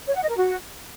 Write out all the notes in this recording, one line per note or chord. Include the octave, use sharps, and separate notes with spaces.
C#5
F#5
D#5
A#4
F#4